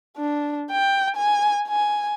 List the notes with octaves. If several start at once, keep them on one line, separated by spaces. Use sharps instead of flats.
D4
G5
G#5
G#5